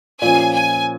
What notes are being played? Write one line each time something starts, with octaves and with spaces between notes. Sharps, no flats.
A#2 F3 C#4 G#5
G#5